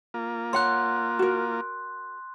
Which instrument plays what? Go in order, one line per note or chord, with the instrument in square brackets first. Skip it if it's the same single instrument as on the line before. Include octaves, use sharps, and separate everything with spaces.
[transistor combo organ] A#3 F4
[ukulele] C#5 F#5 [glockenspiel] C6 F#6
[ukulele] F#4 A#4